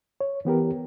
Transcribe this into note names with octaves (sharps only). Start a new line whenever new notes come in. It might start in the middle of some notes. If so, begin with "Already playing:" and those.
C#5
E3 B3 G4 A#4